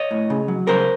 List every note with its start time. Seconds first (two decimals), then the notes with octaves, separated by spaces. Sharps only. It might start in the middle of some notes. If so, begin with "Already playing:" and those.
Already playing: C#5 D#5
0.11 A2
0.30 C#3
0.48 F#3
0.67 C#3 A#4 C5